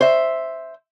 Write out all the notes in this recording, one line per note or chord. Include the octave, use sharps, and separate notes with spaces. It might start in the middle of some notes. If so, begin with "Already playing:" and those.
C5 E5